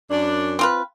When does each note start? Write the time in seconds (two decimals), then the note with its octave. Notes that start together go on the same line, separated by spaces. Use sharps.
0.11 F#2 D4
0.59 C4 F4 B4